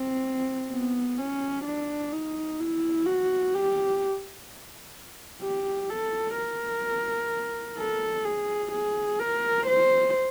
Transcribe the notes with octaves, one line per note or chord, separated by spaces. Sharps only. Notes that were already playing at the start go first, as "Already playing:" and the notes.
Already playing: C4
B3
C#4
D4
D#4
E4
F#4
G4
G4
A4
A#4
A4
G#4
G#4
A#4
C5